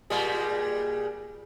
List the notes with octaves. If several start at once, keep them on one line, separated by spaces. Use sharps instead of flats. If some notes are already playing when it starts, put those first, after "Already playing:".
A#2 G3 G#3